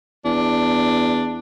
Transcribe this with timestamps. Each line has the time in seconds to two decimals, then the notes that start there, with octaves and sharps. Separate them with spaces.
0.25 E2 D4